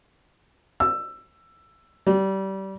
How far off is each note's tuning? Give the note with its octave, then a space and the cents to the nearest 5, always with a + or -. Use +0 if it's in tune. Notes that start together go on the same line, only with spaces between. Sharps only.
E6 +15
G3 -25